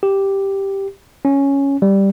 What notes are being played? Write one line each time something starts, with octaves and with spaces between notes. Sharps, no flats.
G4
C#4
G3